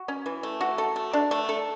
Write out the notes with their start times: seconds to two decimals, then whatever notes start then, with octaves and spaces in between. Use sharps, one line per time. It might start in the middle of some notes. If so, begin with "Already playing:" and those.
Already playing: F#4
0.08 C#4
0.26 E3
0.43 A3
0.61 F#4
0.78 A4
0.96 A3
1.13 D4
1.31 A3
1.49 A4